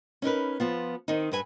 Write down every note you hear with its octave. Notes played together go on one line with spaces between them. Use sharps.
C#4 D#4 A#4 B4
F3 B3 F4
D#3 C4 D#4
G2 A4 B4 G#5